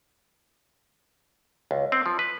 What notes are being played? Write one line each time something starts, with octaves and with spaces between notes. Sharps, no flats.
C#2
C4
F3
B4